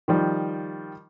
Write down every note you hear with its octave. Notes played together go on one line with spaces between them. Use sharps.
D#3 F3 G3